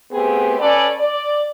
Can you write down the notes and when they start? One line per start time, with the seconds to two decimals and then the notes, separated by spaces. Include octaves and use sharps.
0.12 A3 B3 C4 G4 G#4
0.59 C#4 A4 B4 D5
0.99 D5